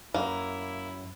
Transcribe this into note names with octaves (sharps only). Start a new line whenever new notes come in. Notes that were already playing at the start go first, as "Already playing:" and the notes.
F#2 A#3 E4